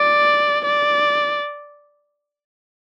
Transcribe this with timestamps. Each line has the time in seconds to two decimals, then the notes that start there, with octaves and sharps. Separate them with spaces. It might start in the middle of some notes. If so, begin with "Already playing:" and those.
Already playing: D5
0.66 D5